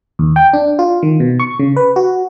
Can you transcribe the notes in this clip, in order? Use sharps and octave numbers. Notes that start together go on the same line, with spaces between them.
D#2
G5
D4
F4
D#3
B2
C#6
C#3
B4
F#4